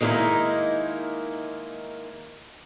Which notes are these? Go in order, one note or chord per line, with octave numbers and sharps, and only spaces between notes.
D#3 G#3 A#3 C#4 D#4 E4